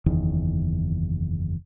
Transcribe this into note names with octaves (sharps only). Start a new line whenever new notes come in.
F#1 E2 D#3